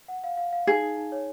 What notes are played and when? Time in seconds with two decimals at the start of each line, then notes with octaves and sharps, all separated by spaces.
0.08 F#5
0.24 F5
0.37 F5
0.53 F5
0.67 D#4 G#4
0.82 D#4
0.97 D#4
1.12 C#5